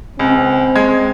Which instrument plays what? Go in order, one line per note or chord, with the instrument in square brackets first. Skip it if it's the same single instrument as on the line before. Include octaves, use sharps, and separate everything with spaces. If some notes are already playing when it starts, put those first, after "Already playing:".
[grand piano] C#2 [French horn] C4
[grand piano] G#3 G#6